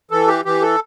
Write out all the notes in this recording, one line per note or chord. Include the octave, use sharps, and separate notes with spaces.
E3 A4
G4
E3 G4
A4